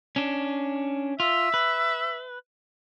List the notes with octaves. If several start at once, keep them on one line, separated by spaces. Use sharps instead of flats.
C#4 D4
F4 E5
B4